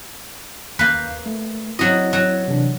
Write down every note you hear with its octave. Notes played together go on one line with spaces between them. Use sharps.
D#2 A#3 B4 F5 G6
A3
F#3 C4 E4 F#4 D#5
F#3
C3 E3 D4